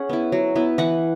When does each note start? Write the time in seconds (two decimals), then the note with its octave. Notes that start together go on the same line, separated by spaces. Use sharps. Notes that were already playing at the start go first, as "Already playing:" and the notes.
Already playing: C#4 G#4 F#5
0.09 B3 E4
0.32 F#3
0.55 B3 E4
0.78 E3 F#5